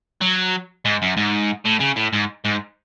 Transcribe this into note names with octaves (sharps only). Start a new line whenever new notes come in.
F#3
G#2
F#2
G#2
A2
C#3
A2
G#2
G#2